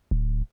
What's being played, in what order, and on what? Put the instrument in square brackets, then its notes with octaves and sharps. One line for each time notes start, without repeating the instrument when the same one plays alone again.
[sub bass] D1